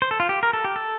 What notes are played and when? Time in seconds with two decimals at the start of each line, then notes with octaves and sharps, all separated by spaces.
0.02 C5
0.11 A4
0.20 F4
0.29 G4
0.43 A#4
0.53 A4
0.65 G4
0.76 A4